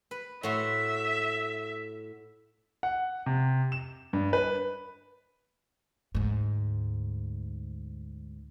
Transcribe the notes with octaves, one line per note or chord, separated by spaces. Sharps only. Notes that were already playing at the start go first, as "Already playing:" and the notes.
B4
A2 F#4 E5 C6
F#5
C3
E7
G2
B4
D2 G#2